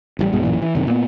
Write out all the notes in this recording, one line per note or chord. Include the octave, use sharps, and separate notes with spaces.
A1 E3 G3
B1 G2 B2 G#3
A1 F#2 A#2 E3
E3
F#1 C3 D#3
A#2 B3